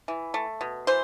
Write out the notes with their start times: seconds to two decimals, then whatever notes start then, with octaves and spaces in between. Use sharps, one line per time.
0.08 E3
0.34 A3
0.61 B2
0.87 E3 C5